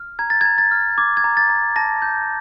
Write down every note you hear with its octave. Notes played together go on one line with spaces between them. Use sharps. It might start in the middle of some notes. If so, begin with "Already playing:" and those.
Already playing: F6
A#5 G#6
A6
A#5 G#6
A6
F6
D6 G#6
G#6
A#5
A6
A#5
A5 A#6
G6